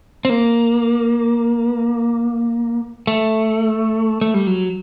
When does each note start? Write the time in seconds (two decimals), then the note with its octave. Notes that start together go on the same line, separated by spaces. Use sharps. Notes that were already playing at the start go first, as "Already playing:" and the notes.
0.25 C4
0.30 A#3
3.07 A3
4.21 A3
4.34 G3
4.47 F#3